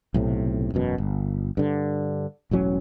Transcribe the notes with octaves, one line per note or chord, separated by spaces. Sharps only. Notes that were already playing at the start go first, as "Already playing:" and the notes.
B1 A2 C3
E1 F#2 B2
G1
G2 D3
E1 A1 F#3 C#4